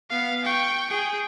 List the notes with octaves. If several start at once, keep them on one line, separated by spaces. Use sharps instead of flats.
B3 F5
G5 C#6
G#4 G5